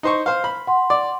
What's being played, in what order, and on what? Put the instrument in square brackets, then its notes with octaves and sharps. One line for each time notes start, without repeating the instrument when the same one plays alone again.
[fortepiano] D#4 C5 C#6
C5 F5
B5
[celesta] F#5 C6
[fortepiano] D5